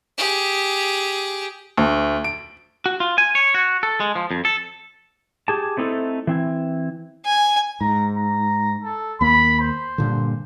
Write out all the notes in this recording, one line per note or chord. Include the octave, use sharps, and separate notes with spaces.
G4 G#4
D2
D7
F#4
F4
G#5
C#5
F#4
A4
G#3
F3
F2
A4
G4 G#4 A5
A3 C4 D#4 E4 A4
E3 C4 E4
G#5
G#2 A#5
A#5
A4
D#2 A#3 B5
C5
G2 A#2 D3